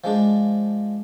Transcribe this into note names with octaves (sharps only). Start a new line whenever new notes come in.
F3 G#3 D4